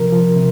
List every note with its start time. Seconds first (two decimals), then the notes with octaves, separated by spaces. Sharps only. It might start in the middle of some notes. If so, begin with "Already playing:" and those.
Already playing: C3 F3 A#4
0.12 F3
0.36 C3